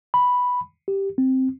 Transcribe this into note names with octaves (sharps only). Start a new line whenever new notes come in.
B5
G4
C4